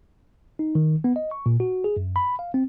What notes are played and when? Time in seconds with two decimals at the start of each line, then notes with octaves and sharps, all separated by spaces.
0.59 D#4
0.75 D#3
1.04 B3
1.16 D#5
1.31 C#6
1.46 A#2
1.60 F#4
1.84 G#4
1.97 F#2
2.16 B5
2.39 F5
2.54 C4